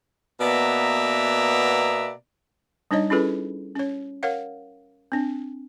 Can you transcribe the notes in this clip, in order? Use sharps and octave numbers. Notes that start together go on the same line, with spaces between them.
B2 A#3 B3 D5 E5 A#5
G3 D4 D#4 C#5 D#5
C#4 E4 F4 G#4 A4 B4
C#4 C#5
A#4 C#5 F5 F#5
C4 D4